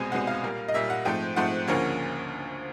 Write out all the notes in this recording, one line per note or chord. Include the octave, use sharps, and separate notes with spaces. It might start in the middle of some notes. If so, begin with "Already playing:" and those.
Already playing: C2 B2 G#3 C4 G#5
C2 B2 G#3 C4 F#5
F5
A#2 G3 A#3
D#5
A#2 G3 A#3 E5
F#5
G#2 F3 A3 C4 G5
G#2 F3 A3 C4 F#5
D2 C#3 F3 A#3 C#4